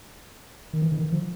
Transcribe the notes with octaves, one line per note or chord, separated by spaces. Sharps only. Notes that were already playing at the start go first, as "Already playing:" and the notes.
D#3
E3
D3
D#3
F3